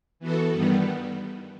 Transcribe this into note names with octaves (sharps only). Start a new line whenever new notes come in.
E3 B3 F#4 A4
G2 D#3 G3 B3